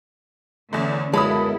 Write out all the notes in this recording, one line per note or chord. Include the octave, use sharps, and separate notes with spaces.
E2 D3 E3 A3 C#4
C#2 F#2 G#3 B3 E4 A4 B5 D#6